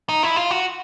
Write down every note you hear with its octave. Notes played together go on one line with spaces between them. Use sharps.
D#4
E4
F4
F#4